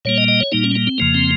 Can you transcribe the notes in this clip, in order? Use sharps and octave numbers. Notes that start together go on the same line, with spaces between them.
A#2 G3 A#3 C#5
D#5
D#5
C#5
A#2 G3 A#3 D#4
C#4
A#3
C4
F2 C#3 F3 A#3
C4